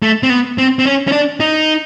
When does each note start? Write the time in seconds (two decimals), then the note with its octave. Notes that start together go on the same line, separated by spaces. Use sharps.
0.02 A3
0.23 C4
0.30 B3
0.58 C4
0.79 C4
0.85 C#4
1.08 C#4
1.12 D4
1.40 D#4